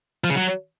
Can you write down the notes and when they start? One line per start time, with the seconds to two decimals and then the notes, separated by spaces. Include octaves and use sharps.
0.24 F3
0.30 C#3
0.35 F#3